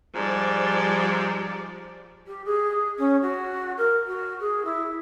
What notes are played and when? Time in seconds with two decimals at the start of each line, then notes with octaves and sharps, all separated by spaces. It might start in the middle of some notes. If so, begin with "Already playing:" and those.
0.15 G#2 F3 G3 D5
2.27 G4
2.45 G#4
2.98 C#4
3.21 F#4
3.77 A#4
4.07 F#4
4.40 G#4
4.65 E4